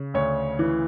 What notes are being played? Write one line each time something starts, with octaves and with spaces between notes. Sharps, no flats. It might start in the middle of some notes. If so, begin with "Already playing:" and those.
Already playing: C#3
D2 C#5
E3